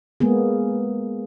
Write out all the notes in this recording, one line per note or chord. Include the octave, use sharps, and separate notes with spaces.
G#3 A#3 B3 G#4